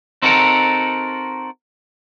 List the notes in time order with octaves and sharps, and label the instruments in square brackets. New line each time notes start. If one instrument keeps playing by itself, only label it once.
[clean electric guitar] C4 D#4 F#4 A4 A#4